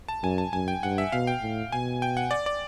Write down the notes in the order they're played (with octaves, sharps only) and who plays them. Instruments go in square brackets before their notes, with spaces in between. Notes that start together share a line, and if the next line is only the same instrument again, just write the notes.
[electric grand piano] A5
[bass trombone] F#2 [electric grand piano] G#5
[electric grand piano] A5
[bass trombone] F#2 [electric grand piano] G#5
[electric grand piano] G5
[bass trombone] G2 [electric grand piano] F#5
[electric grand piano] E5
[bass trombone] B2 [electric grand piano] F5
[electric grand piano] G5
[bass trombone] A2
[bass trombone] B2 [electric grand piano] G#5
[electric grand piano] G5
F#5
D5
D5